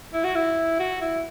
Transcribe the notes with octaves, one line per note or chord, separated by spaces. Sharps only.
E4
F#4
E4
F#4
E4